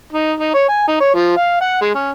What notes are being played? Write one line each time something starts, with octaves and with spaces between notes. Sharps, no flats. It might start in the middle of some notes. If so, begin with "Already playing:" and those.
D#4
D#4
C#5
G#5
D#4
C#5
F3
F5
F#5
G#3
C#4